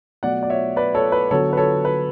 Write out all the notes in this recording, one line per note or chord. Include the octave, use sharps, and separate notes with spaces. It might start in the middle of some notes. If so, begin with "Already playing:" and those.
B2 F#3 A3 D5 F#5
D5
C#5 E5
B4 D5
A4 C#5
B4
D3 F#3 B3 A4 C#5
B4
A4 C#5
B4